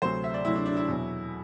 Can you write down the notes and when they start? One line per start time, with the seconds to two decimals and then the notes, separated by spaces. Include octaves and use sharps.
0.02 D2 C3 F#3 C5
0.24 E5
0.34 D5
0.45 D2 C3 F#3 E4
0.55 D4
0.66 D4
0.76 E4
0.88 E2 B2 F#3